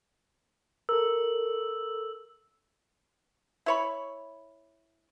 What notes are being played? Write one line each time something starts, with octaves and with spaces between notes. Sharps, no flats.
A4 A#4 E6
E4 C#5 B5